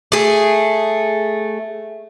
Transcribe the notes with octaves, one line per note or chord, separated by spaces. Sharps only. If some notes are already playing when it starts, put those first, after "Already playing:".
A3 G#4